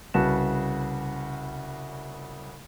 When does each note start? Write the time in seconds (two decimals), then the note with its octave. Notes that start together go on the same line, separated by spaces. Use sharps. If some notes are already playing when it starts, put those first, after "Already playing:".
0.14 C2 C#3 F#4 B4 A5 E7